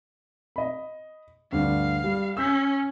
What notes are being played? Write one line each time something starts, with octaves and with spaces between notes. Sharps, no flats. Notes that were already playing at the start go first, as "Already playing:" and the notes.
D#5 B5
D2 G2 D4 F5
G3
C#4 E6 G6 B6